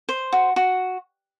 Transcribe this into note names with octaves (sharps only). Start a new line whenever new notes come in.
C5
F#4
F#4